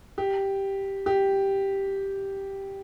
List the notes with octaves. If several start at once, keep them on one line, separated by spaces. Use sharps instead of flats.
G4
G4